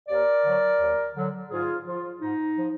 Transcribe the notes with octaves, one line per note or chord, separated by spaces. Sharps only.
D#2 A#4 D5
D3 F#3
D#2
D3 F#3
G#2 F4 G#4
F3 F4
G#2 D#4
F3